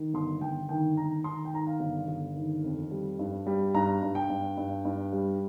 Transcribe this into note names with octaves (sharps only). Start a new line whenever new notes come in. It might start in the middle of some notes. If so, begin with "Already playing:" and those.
Already playing: D#3
G1 C6
G1 G5
D#3 G5
D#3 A#5
D#3 C6
A#5
G5
D#3 A#5
F5
G1
G1
D#3
F2
G3
G2
G3
G2 A#5
G2
G5
G2
G2
G2
G3